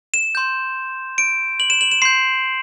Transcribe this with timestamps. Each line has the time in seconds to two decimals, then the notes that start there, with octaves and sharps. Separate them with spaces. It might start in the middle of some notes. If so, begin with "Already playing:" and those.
0.14 E7
0.35 C6 G6
1.18 D7
1.60 F#7
1.70 E7
1.81 F#7
1.92 E7
2.02 C6 G6 C7